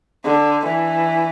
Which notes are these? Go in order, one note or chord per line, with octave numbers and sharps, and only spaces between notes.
D3
E3